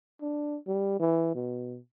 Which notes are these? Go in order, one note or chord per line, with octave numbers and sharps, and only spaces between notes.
D4
G3
E3
B2